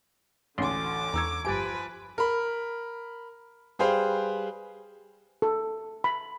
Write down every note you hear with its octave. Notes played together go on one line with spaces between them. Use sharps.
A1 D2 D3 C6 D6
E2 A#5 C#6 E6 G#6
G1 F3 G4 B4 G#5 A6 D7
A#4 B5
G3 G#4 B4 C5 F5 G5
A4
B5